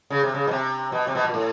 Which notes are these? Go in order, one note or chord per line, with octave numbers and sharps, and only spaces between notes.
C#3
C3
C#3
B2
C3
B2
C3
B2
A#2
A2